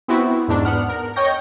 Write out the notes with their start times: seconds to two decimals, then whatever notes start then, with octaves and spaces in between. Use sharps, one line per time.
0.08 B3 C4 E4 F#4
0.48 E2 G#2 D4
0.65 B3 F#5 F6
0.89 A#4
1.16 C#5 D#5 G5 C#6 G6 A#6